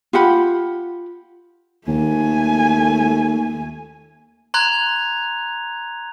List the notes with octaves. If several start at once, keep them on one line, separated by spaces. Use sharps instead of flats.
F4 G4 F#5 B5
D#2 A3 G#5
A#5 C6 F#6 G#6 F7